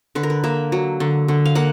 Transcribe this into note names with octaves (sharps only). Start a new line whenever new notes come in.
D3 B4
A#4
B4
A#3 E5
F#3
D3
D3
F5
A#3 F#5